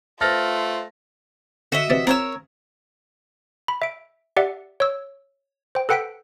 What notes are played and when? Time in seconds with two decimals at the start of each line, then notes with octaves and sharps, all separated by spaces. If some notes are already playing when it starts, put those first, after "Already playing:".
0.21 A3 F4 B4 C5 A5 F6 A6 A#6
1.72 D3 F#4 D#5 E5
1.90 C3 E3 D5
2.07 C4 F4 G#4 A#4 C#5 E6
3.68 B5
3.82 E5 D7
4.37 G4 D5 E5 F#5
4.80 C#5 E6
5.75 C5 G5
5.89 A4 B4 F#5 G5 B6 D7